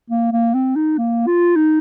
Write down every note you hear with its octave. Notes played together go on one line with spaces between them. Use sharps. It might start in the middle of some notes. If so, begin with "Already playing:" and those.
A#3
A#3
C4
D#4
A#3
F4
D#4